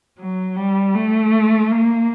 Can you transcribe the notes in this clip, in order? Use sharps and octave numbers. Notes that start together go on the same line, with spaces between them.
F#3
G3
A3
A#3